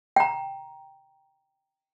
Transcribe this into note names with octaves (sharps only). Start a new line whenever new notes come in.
G5 A#5